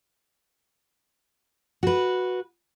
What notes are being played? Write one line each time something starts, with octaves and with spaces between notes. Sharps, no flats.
F#4 B4